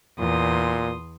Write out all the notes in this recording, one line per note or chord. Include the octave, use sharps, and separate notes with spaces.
E2 A#2 C6 D#6